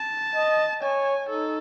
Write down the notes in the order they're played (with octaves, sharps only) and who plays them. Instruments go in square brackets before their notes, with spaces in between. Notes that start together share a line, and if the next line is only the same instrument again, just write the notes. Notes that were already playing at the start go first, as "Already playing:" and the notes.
Already playing: [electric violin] A5
[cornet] D#5
[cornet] C#5 [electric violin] G#5
[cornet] D#4 [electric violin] A4